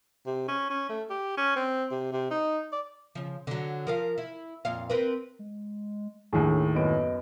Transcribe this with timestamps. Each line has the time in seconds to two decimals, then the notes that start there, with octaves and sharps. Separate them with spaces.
0.26 C3
0.48 C#4
0.70 C#4
0.89 A3
1.10 G4
1.37 C#4
1.56 C4
1.91 C3
2.12 C3
2.31 D#4
2.72 D5
3.15 C#3 F3
3.47 D3 F#3
3.87 F3 A#4 F5
4.18 E4
4.65 F2 A#2 F5
4.90 C4 A#4 B4
5.39 G#3
6.33 D#2 A2 D4 G#4
6.75 F#2 B3 D#5 D7